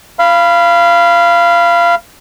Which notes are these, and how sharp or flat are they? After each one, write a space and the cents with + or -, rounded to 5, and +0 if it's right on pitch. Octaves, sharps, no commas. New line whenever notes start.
F5 -20 B5 +0